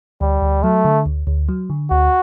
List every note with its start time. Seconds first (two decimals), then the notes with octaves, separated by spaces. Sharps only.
0.21 D2 G3
0.42 D2
0.63 F#3 A3
0.85 D3
1.06 D2
1.27 D2
1.49 F#3
1.70 D3
1.90 D2 F#4